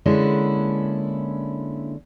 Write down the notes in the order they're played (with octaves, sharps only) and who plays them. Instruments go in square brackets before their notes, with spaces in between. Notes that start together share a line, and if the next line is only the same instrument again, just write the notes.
[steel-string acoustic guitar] D3 G#3 A#3 C#4 D4 E4